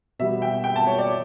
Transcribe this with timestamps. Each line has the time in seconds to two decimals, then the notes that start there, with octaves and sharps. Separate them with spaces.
0.19 B2 G3 B3 E5
0.42 G5
0.64 G5
0.76 A5
0.87 C#5
0.99 D5